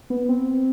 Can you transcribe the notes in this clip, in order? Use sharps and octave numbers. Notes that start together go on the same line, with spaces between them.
B3
C4